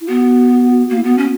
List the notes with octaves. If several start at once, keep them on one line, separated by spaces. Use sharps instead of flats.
E4
B3 F#4
A#3 F#4
E4
B3 F#4
C#4